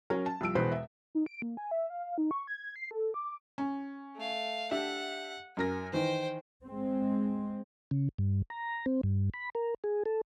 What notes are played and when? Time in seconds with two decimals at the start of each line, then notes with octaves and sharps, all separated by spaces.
0.10 F#3 C#4 A#4
0.26 A5
0.41 C2 F3 E6 D7
0.55 E1 E2 B2 F#4 B4 C5
0.72 E5
1.15 D#4
1.26 D7
1.42 A#3
1.57 G#5
1.71 E5
1.90 F5
2.18 D#4
2.31 C#6
2.47 G#6
2.76 C7
2.91 A4
3.14 D6
3.58 C#4
4.16 A3 F5
4.71 D4 G4 E5 F#5
5.57 F#2 A#4 G#5 A#6
5.93 D#3 E3 C5 G5
6.65 G#3 C4
7.91 C#3
8.18 G2
8.50 A#5
8.86 C4
9.03 G2
9.34 B5
9.55 A#4
9.84 G#4
10.06 A4